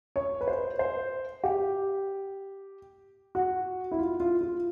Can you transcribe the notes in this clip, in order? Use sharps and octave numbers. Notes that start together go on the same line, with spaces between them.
C#5
B4
C5
C5
G4
F#4
E4
F4
F4
F4